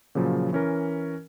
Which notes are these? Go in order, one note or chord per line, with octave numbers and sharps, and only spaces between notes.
A#2 C#3 F3 F#3
E3 C#4 A#4